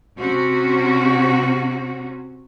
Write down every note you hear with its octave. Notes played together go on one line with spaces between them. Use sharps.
C3 C4 C#4 F#4